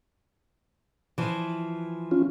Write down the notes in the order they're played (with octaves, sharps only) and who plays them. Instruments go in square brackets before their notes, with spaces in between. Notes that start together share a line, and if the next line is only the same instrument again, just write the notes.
[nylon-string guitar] E3 F3
[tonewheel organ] C#4 F4